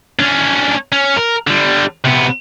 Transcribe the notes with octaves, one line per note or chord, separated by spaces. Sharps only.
C#4 D4
C#4
A#4
D3 G3
C3 B3